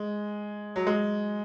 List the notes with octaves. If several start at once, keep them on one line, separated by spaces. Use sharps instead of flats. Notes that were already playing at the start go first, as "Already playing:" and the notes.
Already playing: G#3
F#3
G#3